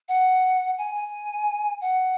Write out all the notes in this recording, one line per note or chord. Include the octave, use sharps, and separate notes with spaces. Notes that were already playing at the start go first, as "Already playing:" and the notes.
F#5
G#5
G#5
F#5